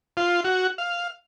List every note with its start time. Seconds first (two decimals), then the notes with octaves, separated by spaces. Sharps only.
0.17 F4
0.44 F#4
0.78 F5